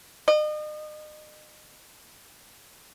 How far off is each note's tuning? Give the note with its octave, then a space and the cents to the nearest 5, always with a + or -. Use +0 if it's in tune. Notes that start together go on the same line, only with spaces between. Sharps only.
D#5 -35